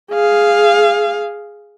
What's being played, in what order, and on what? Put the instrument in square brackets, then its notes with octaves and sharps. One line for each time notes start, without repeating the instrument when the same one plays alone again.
[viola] G#4 F5